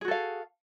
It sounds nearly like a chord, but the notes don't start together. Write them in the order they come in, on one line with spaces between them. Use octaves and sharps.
G#4 F#4 A4 F5